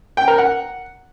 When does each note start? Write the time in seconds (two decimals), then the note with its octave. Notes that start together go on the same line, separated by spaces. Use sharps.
0.17 G5
0.28 A#4
0.38 F#5